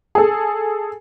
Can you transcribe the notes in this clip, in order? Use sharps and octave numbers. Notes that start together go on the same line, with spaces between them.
G#4 A4